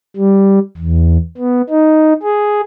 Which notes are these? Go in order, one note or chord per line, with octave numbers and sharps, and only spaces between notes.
G3
E2
B3
D#4
G#4